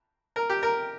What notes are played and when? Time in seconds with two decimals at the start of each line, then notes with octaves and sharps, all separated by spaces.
0.36 A#4
0.50 G4
0.63 A#4